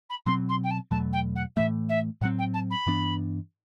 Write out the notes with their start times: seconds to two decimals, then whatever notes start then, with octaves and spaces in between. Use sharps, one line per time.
0.09 B5
0.26 B2 F#3 C4 C6
0.48 C6
0.63 G5
0.70 A5
0.91 E2 B2 F#3 A3 A5
1.12 G5
1.35 F#5
1.56 A2 E3 A3 E5
1.89 E5
2.21 A2 F#3 C4 F#5
2.38 G5
2.53 A5
2.70 B5
2.87 G2 E3 B3 D4